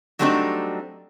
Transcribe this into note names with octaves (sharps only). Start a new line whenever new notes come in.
F#3 G3 A3 C4 D4 D#4